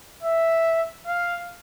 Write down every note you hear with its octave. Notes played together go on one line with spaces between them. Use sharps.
E5
F5